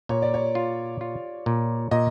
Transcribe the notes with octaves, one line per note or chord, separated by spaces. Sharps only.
A#2 C#5
D5
C#5
F4
F4
A#2
A#2 D#5